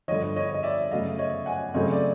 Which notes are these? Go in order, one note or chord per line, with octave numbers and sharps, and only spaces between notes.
G2 D3 F3 C#5 D#5
C#5 D#5
D#5
D5 E5
F#2 C#3 F#3 A3 D#5 F5
C#5 D#5
F#5 G#5
C#3 F#3 A3 C4 C#5 D#5
D5